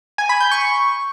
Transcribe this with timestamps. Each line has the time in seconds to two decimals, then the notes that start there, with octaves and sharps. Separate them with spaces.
0.18 G#5
0.29 B5
0.40 G6
0.51 C#6